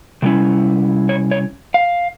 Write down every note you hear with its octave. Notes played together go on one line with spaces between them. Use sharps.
C3 G3 C#4 E4
C#5
C#5
F5